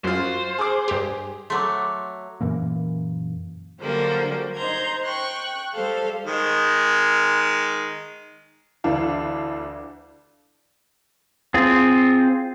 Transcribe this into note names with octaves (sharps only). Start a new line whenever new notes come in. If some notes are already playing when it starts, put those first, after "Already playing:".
F#2 F4 F#4 C5
G#4 D6
G2 G4
F#3 A3 C6 D6
F#2 A#2 E3 A#3
D3 F#3 G3 A#3 C5
D#4 C5 A#5 G6 G#6
G5 C#6 F#6
G3 A4 C5 F5
D#3 G#3
D2 E3 D4 F5
C4 F4 G#4